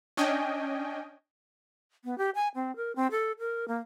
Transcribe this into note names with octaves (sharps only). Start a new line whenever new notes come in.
C#4 D4 D#5 G5 G#5
B3
G4
G#5
C4
A#4
C4
A4
A#4
A#3